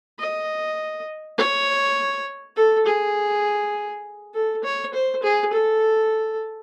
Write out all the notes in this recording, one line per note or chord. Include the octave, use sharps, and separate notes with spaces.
D#5
C#5
A4
G#4
A4
C#5
C5
G#4
A4